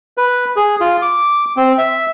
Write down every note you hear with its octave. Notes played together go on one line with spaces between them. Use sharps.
B4
G#4
F4
D6
C4
E5